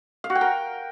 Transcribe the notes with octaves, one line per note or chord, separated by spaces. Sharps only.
F5
F#4
G5
A#4